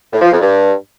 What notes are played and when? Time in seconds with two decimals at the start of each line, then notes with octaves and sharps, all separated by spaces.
0.12 A2
0.22 F3
0.31 F2
0.41 G2